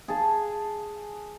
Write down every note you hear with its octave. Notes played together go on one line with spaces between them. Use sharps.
G#4 A5